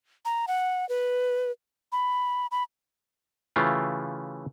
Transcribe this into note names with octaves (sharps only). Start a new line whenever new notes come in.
A#5
F#5
B4
B5
B5
C#3 E3 A3 F4 G4 F5